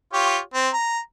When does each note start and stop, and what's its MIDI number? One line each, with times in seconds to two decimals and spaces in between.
0.13 0.39 65
0.13 0.39 67
0.13 0.39 73
0.54 0.69 60
0.73 0.99 82